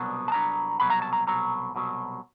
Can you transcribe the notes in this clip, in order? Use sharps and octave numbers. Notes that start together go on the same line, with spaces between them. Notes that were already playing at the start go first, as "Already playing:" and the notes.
Already playing: C2 B2 F#3 B3 D4
A5
C2 B2 F#3 B3 D4 A#5
C2 B2 F#3 B5
A#5
A5
A#5
C2 B2 F#3 A#5
C2 B2 F#3